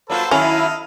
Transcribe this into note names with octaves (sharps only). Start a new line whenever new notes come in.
F#3 A#3 F4 A4 B4 C5
D#3 F#3 C#4 E4 A4 D#5 F5